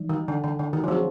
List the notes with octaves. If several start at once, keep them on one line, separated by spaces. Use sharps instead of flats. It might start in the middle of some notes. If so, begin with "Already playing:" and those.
Already playing: E3 G3 D#4
D#3
D3
D3
D3
D#3
F3
F#3 A3 C4 F4 G#4